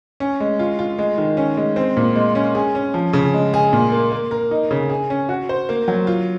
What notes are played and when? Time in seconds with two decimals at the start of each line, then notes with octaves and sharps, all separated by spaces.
0.20 C#4
0.40 G#3
0.59 F4
0.79 F4
0.99 G#3
1.18 D#3
1.37 C#4
1.57 G#3
1.76 C4
1.97 A#2
2.16 G#3
2.35 C#4
2.55 G#4
2.75 C#4
2.94 F3
3.13 C#3
3.34 G#3
3.54 G#4
3.73 A#2
3.92 A#3
4.12 A#3
4.31 A#4
4.51 D#4
4.71 C#3
4.90 G#4
5.10 C#4
5.29 F#4
5.49 C5
5.69 A#3
5.88 F#3
6.07 F4